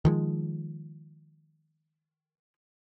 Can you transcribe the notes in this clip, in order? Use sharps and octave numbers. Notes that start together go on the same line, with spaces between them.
D#3 F3 G#3